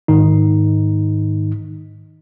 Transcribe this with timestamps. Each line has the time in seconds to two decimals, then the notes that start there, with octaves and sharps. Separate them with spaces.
0.08 G#2 D#3 D#4